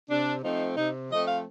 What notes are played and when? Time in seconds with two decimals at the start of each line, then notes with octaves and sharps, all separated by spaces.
0.09 C3 D4
0.43 F3 A3 C4 D#4
0.77 C3 D#4
1.10 F3 A3 C4 D#5
1.27 F5